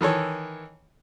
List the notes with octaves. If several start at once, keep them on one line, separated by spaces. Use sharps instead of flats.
D#3 E3 A4 C#5